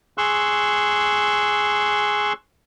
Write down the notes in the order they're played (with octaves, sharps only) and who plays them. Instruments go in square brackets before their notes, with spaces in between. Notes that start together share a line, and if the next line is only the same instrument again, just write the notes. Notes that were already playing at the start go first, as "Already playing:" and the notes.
[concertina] G#4 C6 C#6 E6 F#6